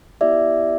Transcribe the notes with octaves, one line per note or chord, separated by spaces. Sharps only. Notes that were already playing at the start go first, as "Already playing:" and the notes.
B3 E4 G4 D5 E5